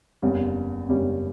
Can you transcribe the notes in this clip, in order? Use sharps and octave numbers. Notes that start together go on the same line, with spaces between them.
F#1 E2 C#3 G3 C#4
F#1 E2 C#3 G3 C#4